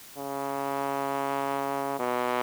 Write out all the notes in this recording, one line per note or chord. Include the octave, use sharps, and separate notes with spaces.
C#3
B2